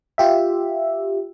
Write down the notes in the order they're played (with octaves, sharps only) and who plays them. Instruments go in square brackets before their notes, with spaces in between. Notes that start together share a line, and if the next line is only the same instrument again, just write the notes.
[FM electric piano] F4 G4 E5